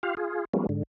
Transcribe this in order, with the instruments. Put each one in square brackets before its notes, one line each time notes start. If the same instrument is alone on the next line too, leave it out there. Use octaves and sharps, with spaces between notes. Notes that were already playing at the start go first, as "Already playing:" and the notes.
[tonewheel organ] F4 G4 F5
F4 G#4
F3 G3 G#3 A#3 B3 C#4
G#2 D3